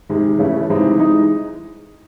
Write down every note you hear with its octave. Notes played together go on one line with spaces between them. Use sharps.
C3 D#3 G#3
C#3 E3 A3 C#4 E4
C3 E3 G#3 C4 D#4
E3 G#3 D#4